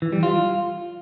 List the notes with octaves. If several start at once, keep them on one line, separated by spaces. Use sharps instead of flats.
E3
G3
F4